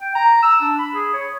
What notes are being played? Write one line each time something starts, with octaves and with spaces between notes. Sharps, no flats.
G5
A#5
E6
D4
B5
G#4
C#5